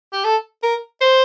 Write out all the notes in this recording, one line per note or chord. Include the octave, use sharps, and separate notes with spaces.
G4
A4
A#4
C5